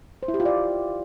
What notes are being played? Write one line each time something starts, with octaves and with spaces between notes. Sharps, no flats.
C5
E4
G4
F4
D5